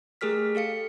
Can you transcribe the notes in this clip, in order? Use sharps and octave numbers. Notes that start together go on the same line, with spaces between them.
A3 G4 G#4 A#4 F6 B6
G4 A4 F5 C#7